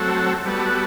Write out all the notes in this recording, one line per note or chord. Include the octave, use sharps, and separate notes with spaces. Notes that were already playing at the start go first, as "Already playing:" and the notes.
Already playing: F#3 A3 C4 F#4 A4
G3 B3 F#4 A4